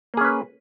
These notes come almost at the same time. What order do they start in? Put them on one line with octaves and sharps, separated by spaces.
A#3 G#4 C#4 B4